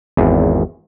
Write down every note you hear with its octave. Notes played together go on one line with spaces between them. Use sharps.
G#1 E2